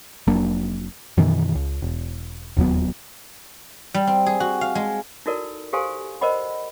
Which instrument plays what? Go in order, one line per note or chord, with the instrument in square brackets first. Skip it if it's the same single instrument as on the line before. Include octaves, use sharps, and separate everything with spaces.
[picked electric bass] F1 F#3 A#3 D4
F#2 B2 D#3 E3
C#2
E1
E1 D#2 F#3 B3
[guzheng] G3
C4
G#4
F#4
F5
G#3
[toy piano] D#4 E4 F#4 A4 A#4 D5
G4 A4 C5 F5 G#5 C6
A#4 C5 D5 D#5 F#5 B5